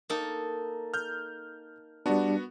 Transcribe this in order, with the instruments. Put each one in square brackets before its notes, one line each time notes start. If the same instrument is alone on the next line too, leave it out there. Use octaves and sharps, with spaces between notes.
[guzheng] A#3 D#4 A4
[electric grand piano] F6 G6
[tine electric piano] G3 D4 [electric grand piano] B3 F#4